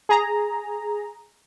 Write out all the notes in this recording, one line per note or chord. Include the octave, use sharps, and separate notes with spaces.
G#4 A#5